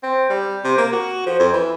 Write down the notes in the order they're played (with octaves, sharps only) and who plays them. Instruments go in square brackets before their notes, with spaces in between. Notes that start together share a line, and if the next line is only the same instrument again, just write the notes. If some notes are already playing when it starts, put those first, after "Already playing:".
[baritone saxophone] C4
G3
C3
A#3
F#4
F3
F2
E3